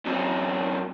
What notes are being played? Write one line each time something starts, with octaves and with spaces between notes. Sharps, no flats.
F#2 C4